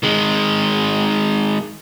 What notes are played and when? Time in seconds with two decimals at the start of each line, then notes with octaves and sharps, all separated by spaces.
0.03 D#3 G#3